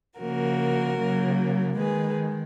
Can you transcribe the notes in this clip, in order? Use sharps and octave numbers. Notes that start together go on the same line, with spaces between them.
C#3 F3 A#3 F#4 A#4
C#3 F#3 A#3
D#3 G#3 G#4 B4